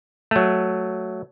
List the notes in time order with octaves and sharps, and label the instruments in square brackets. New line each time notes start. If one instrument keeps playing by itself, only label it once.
[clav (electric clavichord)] F#3 A3